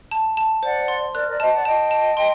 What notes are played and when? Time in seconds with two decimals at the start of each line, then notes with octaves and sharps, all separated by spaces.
0.11 A5
0.37 A5
0.62 C5 D5 F#5
0.88 C6
1.14 A#4 D5 F#6
1.27 A#4 D5
1.40 C5 D#5 A5
1.53 D5 F#5
1.65 D#5 G5 A5
1.91 A5
2.17 C6